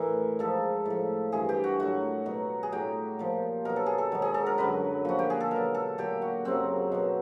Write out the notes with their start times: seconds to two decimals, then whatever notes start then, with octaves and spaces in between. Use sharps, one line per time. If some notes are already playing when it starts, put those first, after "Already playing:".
Already playing: A2 E3 A#4
0.39 G#2 F3 A4
0.85 A2 F3
1.32 G2 E3 G#4
1.49 G4
1.64 F#4
1.79 A2 F#3 F#4
2.26 B2 F#3
2.63 G#4
2.72 A2 F#3 G4
3.19 A#2 F3
3.65 B2 F#3 A#4
3.76 A4
3.86 G#4
3.98 A4
4.12 G#2 D#3 F#3
4.22 G#4
4.34 A4
4.46 A#4
4.58 F#2 D3 F#3 B4
5.05 A#2 F3 F#4
5.19 G4
5.30 G#4
5.40 A4
5.51 B2 F#3 A#4
5.74 A4
5.98 A#2 F#3 G4
6.22 F#4
6.45 F#2 C#3 F#3 C4
6.92 B2 F#3